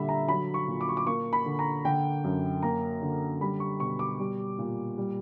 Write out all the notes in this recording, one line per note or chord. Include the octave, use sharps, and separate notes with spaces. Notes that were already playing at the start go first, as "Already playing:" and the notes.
Already playing: A#2 D3 G3 E5 B5
A#5
F#3 B5
C#6
A#2
D6
C#6
D6
A#3 C#6
B5
D3
A#5
D3 G5
F#2
A#3 A#5
D3
G3 B5
C#6
B2 C#6
D6
G3
A#2
G3